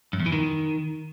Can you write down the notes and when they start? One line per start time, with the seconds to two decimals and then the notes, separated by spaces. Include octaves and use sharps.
0.13 F#2
0.20 E2
0.26 E3
0.32 D#3